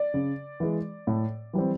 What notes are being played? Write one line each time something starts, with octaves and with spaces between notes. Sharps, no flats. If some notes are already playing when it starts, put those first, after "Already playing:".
Already playing: D5
C#3
E3 G#3
A2
E3 G3 C4